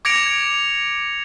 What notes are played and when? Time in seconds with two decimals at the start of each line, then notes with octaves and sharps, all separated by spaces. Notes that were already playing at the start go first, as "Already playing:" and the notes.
0.05 D6 G#6 A#6 C#7 D7 F7